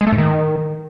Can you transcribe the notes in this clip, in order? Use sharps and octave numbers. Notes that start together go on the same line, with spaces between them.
G#3
A3
G#2
D#3